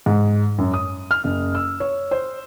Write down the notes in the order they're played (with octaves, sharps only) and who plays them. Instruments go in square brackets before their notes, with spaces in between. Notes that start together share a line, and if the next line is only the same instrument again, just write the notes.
[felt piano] G#2
F#2
D#6
F6
F#1
E6
C#5
C5